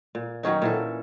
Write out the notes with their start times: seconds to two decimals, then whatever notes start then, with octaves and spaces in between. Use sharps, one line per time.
0.15 A#2
0.43 D#3 F#3 C#4 D#4
0.62 A#2 E3 A4